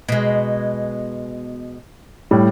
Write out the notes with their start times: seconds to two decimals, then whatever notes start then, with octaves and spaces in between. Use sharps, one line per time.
0.08 B2 G#3
2.31 A2 G3